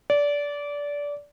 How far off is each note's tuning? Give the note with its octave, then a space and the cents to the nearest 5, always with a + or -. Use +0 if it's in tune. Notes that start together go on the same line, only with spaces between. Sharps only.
D5 -20